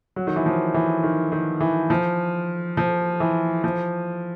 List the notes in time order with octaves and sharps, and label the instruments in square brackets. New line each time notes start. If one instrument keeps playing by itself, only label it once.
[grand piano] F#3
D#3
E3
F3
E3
D#3
D#3
E3
F3
F3
E3
F3